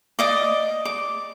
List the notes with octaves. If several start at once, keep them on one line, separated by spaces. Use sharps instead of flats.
D5 D#5 D6
D6